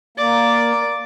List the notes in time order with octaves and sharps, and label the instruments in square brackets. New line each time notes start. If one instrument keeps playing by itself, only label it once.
[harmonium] A#3 [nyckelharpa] D5